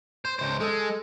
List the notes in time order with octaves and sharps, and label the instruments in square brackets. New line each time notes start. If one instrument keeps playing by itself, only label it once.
[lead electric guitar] C5
C#2 C5
[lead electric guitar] G#3 [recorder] A4